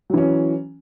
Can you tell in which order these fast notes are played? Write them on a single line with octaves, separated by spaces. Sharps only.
F#3 E3 C#4